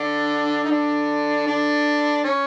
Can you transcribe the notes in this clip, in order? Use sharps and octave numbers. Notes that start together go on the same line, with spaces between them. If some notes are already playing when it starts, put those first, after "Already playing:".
Already playing: D3 D4
D#4
D3 D4
D3 D4
C#4